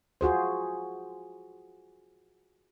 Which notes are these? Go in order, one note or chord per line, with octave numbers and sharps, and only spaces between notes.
F4 F#4 G#4 C5